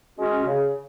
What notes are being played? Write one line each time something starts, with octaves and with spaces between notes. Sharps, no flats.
G#3 C#4 F#4
C#3